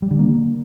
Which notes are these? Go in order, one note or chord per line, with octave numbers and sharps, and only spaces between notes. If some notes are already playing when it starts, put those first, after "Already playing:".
G3
D3
A#3